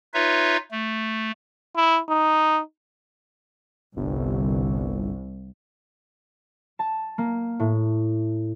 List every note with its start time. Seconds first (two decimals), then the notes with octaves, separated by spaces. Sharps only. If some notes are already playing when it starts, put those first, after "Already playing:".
0.14 D#4 F4 B4 C#5 E5
0.71 A3
1.76 E4
2.09 D#4
3.97 G1 C2
6.79 A5
7.18 A#3
7.60 A2